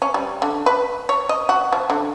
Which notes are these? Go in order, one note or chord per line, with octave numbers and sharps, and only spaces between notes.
C#4
G3
D3
B4
C#5
D#5
F#4
F3
D3